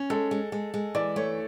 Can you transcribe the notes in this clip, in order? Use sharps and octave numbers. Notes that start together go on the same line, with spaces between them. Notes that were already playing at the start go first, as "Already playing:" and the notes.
Already playing: C#4
G#3 A4
G#3
G#3
G#3
E3 D5
A3 C#5